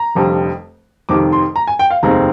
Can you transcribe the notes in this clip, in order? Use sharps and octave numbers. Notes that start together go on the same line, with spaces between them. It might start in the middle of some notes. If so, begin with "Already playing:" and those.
Already playing: A#5
F1 F2 D3 G3
F1 F2 D#3 G3 D6
C6
A#5
G#5
G5
F5
F1 D#2 D#3 G#3 C4 A#5